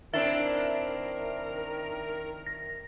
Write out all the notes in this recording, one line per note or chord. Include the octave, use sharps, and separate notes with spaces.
D#3 C4 D4 E4 A#4 E5
A#6